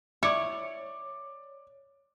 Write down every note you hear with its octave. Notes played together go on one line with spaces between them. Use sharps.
E4 C#5 D5 D6